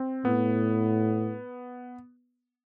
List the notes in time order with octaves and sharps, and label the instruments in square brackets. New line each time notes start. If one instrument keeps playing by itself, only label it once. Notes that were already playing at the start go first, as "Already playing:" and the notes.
Already playing: [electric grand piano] C4
[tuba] A2 [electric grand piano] B3